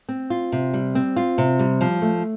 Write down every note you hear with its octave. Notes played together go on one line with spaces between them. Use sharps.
C4
F4
C3
G3
C4
F4
C3
G3
F3
A3